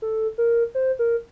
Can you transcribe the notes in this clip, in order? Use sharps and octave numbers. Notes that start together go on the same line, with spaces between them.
A4
A#4
C5
A#4